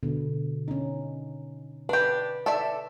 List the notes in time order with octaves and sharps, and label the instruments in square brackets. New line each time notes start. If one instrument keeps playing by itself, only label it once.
[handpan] B2 D3
C#4 D#4
[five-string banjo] D4 G4 [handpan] B4
[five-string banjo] A4 D5 E5